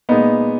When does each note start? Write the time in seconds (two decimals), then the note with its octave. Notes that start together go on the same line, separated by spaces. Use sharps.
0.09 A#2 G#3 B3 D#4